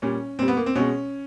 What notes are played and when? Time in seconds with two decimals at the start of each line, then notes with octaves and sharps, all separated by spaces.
0.02 A#2 G3 C#4
0.39 A#2 G3 C4
0.48 B3
0.57 A#3
0.66 C4
0.75 B2 G#3 C#4